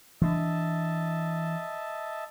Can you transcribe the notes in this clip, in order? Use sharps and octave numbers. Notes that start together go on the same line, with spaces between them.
E3 D4 D#5 E5 A5